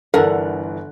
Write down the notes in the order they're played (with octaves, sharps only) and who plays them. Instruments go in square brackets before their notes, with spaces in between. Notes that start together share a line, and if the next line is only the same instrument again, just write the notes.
[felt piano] G1 E3 F#6 [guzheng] D3 [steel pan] A4 [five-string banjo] A#4 F#5